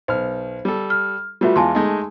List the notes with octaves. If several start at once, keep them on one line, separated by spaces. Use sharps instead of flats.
B1 C5 F6
G3 A4
F6
G3 A3 B3 F4 F#4 E5
E2 G#3 F4 G#5 A5 C6
G#3 A3 D#4